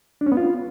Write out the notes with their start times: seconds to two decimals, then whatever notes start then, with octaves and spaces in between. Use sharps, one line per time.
0.21 D4
0.26 C#4
0.32 B3
0.37 F4